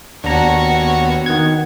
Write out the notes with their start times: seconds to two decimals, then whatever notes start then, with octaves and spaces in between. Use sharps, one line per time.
0.24 D#2 B3 D4 F#4 C#5 A#5
1.26 D#3 F#5 G#6